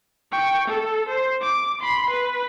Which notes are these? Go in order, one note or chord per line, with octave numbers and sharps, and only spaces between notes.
G5 C#6
A4
C5
D6
B5 C6
B4